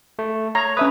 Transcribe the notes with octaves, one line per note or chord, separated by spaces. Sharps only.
A3
C#5 A#5
C#4 B4 E5 D#6